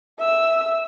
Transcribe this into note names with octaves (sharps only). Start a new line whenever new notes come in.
E5 E6